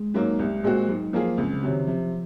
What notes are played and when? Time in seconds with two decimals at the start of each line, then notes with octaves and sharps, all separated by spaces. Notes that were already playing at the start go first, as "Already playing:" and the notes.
Already playing: G#3
0.14 G#2 F#3 A#3
0.39 C2
0.64 A#2 G#3 C4 F#4
0.88 G#2 F#3
1.13 F3 A#3 F4 G#4
1.38 C#2 C4
1.54 C#3
1.63 C3 F#3
1.70 D#3
1.87 C3 F3